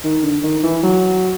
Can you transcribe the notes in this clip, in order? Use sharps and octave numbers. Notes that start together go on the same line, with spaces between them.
D#3
D3
D#3
E3
F#3